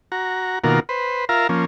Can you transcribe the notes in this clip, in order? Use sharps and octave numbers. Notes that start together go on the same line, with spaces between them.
F#4 A#5
B2 D#3 A#3 F4 F#4 A#4
B4 C5
F4 A#4 E5 F5 A#5
F3 A#3 C#4